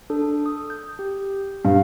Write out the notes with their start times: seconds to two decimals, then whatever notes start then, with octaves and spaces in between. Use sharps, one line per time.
0.10 D4 A4
0.46 D#6
0.70 G6
0.99 G4
1.65 G2 F5